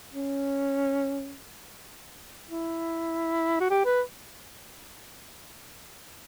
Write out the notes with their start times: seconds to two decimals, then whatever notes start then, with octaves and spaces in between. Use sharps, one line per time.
0.11 C#4
2.50 E4
3.60 F#4
3.70 G4
3.85 B4